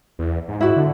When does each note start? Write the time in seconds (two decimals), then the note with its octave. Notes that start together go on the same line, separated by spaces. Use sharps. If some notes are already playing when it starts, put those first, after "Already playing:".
0.19 E2
0.48 G#2
0.61 E4 F#4
0.76 D3